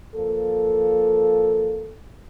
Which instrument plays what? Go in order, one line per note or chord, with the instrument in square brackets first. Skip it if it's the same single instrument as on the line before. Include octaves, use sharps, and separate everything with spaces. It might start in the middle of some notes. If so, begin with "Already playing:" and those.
[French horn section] F3 A#3 A4